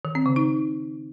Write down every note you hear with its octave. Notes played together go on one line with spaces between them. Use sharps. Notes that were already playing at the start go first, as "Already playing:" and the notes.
D#3
C4
C#3
D#4